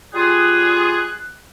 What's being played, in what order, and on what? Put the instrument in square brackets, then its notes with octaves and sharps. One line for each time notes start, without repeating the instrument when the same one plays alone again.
[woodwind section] G3 F4 G#4 [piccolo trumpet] F#6